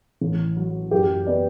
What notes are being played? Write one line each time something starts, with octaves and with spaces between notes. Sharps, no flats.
A1
F#3
F#2 G4
B3 D5